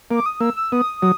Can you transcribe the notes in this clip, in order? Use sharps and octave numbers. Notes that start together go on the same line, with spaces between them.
A#3 D6
D#6
A#3 E6
E6
B3 D#6
F#3